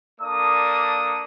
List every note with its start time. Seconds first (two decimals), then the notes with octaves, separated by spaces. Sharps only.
0.21 A#3 D4 A4 D5 D#6